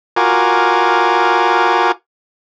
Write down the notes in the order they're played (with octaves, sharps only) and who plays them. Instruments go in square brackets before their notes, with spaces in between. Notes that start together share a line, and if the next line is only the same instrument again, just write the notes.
[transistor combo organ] F4 F#4 A#4 G#5 D6